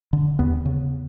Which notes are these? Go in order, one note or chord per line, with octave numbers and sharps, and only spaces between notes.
D3
D#2 B3
C#3